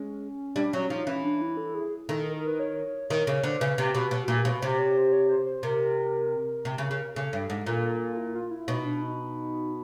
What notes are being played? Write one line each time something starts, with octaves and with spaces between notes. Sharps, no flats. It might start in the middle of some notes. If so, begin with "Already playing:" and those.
Already playing: G#3 C#4
G3 D4
F#3 C#4
F3 D#4
E3 C#4
D4
E4
A4
G#4
D#3 A4
A#4
B4
C#5
D#3 C#5
C#3 C#5
D3 C5
C#3 B4
C3
B2
B2
A#2 F#4
G4
B2 B4
C3 C5
C#5
C5
C#5
C5
C5
C3 A#4
C3
C#3
C#3
C#3 A4
G2
G#2
A#2
E4
F4
E4
B2 D#4
D4
D#4